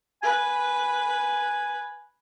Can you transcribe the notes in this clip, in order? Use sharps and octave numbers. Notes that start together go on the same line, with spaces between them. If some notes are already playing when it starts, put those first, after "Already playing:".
B4 G#5